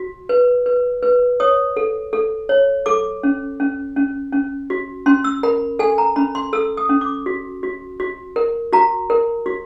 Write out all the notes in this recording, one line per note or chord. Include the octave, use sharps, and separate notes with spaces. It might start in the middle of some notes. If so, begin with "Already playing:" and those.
Already playing: F#4
B4
B4
B4
C#5 D#6
A4
A4
C#5
A4 D6
C#4
C#4
C#4
C#4
F#4
C#4 C6
E6
A#4 B5
A4 G#5
A#5
C#4 B5
C6
A4 E6
D#6
C#4
D6
F#4
F#4
F#4
A#4
F#4 A#5
A#4
F#4